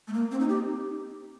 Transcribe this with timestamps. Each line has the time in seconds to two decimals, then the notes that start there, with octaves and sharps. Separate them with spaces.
0.08 A3
0.13 A#3
0.31 C4
0.40 D#4
0.49 G4